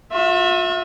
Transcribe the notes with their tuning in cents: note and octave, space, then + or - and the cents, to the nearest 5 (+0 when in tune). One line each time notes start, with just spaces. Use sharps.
F4 +45 E5 +0